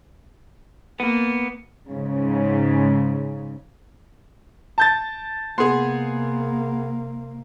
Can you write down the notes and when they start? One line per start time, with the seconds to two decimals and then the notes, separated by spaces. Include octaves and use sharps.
1.00 A#3 B3
1.89 G#2 C#3
4.78 A5 G6 A6
5.58 C3 A#3 B3 G#4 C6